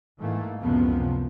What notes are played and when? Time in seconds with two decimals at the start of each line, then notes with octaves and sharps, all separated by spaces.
0.20 G#2 E3 A3 A#3
0.61 C#2 F#2 A2 C3 F3 B3